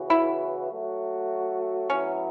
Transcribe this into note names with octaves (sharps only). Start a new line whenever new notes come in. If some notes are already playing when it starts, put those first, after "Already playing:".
Already playing: C#3 E3 B3 F#4
E4
F#3 A3 F#4
A2 F#3 B3 C#4 E4